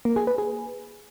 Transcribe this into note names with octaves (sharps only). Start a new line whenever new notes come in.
A#3
G#4
B4
G#4